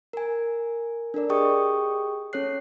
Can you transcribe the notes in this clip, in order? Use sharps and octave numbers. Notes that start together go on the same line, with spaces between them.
A#4 G#5
D4 A4 A#4 D5
G4 G#4 D#5 G5 C#6 D#6
C#4 A4 C#5 F#6 C7